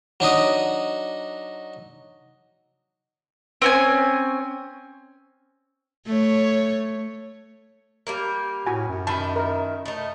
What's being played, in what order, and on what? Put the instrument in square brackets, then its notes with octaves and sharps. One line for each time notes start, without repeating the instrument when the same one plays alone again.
[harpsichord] F#3 D4 D#4 D#6
[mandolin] C4 C#4 G#5
[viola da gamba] A3 C#5
[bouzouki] G3 A#3 A#4
[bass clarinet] A2 [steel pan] F#4 G#5
[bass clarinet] F#2
[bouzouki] D#3 E4 [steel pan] A5 B5
[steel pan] A#4
[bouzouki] A3 D#4